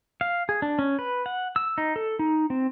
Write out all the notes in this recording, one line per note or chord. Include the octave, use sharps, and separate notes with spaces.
F5
G#4
D4
C#4
B4
F#5
E6
D#4
A4
D#4
C4